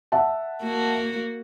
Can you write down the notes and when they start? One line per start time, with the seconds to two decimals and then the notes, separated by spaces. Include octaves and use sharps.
0.12 E5 F#5 A5
0.63 A#3 F#4